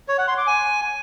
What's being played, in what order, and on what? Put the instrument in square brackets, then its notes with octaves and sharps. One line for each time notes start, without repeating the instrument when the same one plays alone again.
[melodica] C#5
F#5
C6
D6
G#5